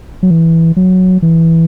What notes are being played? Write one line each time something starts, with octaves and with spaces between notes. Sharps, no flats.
F#3
E3
F#3
E3